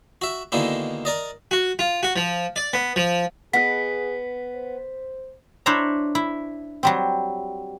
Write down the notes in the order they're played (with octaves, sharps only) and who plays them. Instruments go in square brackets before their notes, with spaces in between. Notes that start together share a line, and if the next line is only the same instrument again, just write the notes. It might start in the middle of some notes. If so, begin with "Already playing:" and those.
[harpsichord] F#4 E5
B2 D3 D#3 G#3 A#3 E4
A#4 D5 D#5
F#4
F4
F#4
F3
D5
B3
F3
[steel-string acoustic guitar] B3 [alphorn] G#4 [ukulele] B4 D#5 F#5 [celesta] B6
[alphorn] C5
[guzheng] D4 E4 C5 C#5 E5 A#5
E4
F#3 G3 C4